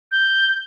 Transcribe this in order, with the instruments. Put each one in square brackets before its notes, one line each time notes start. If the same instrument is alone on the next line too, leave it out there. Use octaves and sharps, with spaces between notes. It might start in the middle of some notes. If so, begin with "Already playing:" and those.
[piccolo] G6